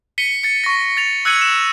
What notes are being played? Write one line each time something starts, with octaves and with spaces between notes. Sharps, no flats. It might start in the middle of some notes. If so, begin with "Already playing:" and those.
B6 C#7 D#7 G7
A6 C#7
C#6 A#6
A6 F7
E6 F#6 G#6 C#7 D#7 F#7
E7